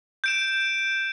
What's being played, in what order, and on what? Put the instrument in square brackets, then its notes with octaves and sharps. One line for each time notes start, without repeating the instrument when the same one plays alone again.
[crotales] G6 D7 E7